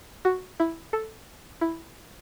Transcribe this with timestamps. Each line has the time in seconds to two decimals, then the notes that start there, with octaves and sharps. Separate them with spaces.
0.25 F#4
0.60 E4
0.93 A4
1.61 E4